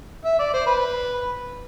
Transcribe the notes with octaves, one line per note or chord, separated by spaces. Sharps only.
E5
D5
C5
B4